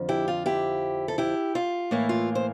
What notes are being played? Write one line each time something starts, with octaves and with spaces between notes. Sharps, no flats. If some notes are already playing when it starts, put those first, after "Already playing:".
Already playing: F2 D3 F3
E4 G4
F4
E4 G4
A4
E4 G4
F4
A2 E3 A#3 E4
F4
C5